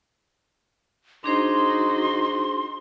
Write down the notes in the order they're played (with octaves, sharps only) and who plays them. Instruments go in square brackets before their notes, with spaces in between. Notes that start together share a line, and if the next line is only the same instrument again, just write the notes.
[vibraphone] D4 G#4 C5 [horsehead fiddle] D#4 F#4 [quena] C6